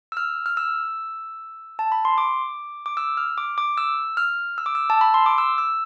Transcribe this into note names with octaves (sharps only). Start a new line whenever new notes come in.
E6
F6
F6
E6
A5
B5
C6
D6
D6
E6
F6
D6
D6
E6
F6
E6
D6
E6
A5
B5
C6
D6
E6
E6